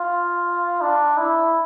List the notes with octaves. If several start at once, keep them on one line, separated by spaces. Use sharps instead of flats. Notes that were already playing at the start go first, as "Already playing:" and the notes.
Already playing: F4
D4
E4